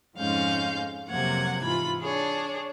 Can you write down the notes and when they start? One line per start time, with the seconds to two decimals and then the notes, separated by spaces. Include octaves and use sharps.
0.17 F2 G#2 G#3 C#4 F5 G6
1.08 F2 C3 F#3 A#3 F#5 G#6
1.60 G#2 E3 F4 B5
2.02 D4 G#4 C#5